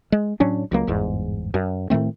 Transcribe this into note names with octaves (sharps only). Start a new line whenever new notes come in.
G#3
A2 F#3 C#4 D4
C#2 F#3 A#3
G1 E2 G#2
F#2
A2 D#3 A3 C4